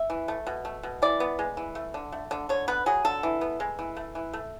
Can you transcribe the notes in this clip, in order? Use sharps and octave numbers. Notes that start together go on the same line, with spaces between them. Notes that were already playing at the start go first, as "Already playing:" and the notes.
Already playing: E5
E3
A3
B2
A3
B2
E3 D5
B3
G#3
E3
A3
D3
A3
D3
D3 C#5
B3 B4
F#3 G#4
D3 A4
E3
B3
G#3
E3
A3
E3
A3